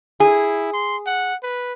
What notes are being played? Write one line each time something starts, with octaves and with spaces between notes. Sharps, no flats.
E4 G#4
C6
F#5
B4